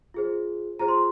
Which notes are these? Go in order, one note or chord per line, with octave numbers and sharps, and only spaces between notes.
F4 G#4 C5
F4 G#4 C5 A#5
C6